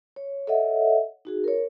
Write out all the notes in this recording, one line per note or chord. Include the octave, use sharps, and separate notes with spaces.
C#5
A4 C#5 D#5 E5 F#5
D#4 F#4 G#4
A#4 C#5